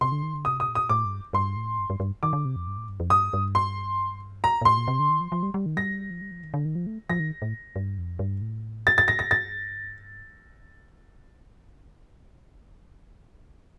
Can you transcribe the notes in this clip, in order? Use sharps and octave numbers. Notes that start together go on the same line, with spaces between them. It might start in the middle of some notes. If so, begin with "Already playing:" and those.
C3 C6
D3
D#3
D3
C3 D#6
D#6
A#2
D#6
A2 D6
G2
G2 C6
A2
G2
G2
G2
D#3 D6
D3
C3
F2
G2
A2
G2
F2
G2 D#6
G2
C6
F2 A#5
A#2
A2 C6
A#2
C3
D3
D#3
F3
F3
G3
G3
D#3
G3 A#6
F3
G3
F3
D#3
D3
D#3
F3
A3
F3 A#6
D#3
A2
G2
F2
G2
A2
A6
A6
A#6
A#6
G2 A6